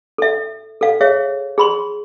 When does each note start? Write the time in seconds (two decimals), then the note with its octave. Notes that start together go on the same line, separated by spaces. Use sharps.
0.18 A4 E5
0.81 A4 F5
1.01 G#4 C#5 E5 F5
1.58 G#4 B5 C6